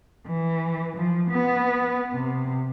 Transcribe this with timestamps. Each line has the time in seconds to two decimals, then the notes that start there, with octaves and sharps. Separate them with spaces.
0.26 E3
0.96 F3
1.31 B3
2.13 C3